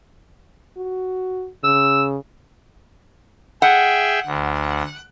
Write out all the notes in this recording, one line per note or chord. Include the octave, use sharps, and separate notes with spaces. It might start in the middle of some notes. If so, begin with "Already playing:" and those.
F#4
C#3 E6
G#4 E5 F#5 G5
D2